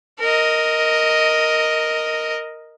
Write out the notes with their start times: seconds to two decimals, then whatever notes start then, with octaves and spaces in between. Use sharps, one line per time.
0.19 A#4 D#5